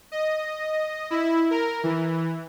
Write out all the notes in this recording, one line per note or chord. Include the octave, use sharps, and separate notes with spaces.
D#5
E4
A#4
E3